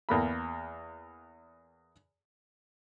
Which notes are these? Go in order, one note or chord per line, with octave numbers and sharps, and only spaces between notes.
E2 A#3 B5